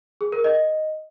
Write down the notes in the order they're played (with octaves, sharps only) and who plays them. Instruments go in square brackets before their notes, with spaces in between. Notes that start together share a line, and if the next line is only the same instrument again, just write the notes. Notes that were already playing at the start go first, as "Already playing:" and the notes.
[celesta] G#4
A#4
D#5